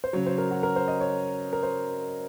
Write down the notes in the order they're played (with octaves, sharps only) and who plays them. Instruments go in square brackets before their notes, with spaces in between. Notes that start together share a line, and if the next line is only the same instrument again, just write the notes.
[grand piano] C5
C#3 F#3 C#5
C5
A#4
F#4
A#4
C5
D#5
C#5
A#4
C5